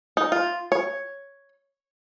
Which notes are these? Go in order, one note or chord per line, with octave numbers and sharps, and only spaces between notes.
D#4
F4
C#5